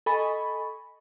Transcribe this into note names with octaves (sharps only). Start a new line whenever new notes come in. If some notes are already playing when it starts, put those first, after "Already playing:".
A4 D#5 G#5 B5 C#6